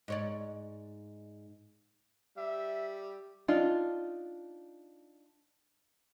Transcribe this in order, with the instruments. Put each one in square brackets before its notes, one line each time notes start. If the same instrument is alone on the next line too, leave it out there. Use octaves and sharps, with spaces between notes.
[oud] G#2 C#5 D5
[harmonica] G3 [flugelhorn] E5
[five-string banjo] D4 D#4 F4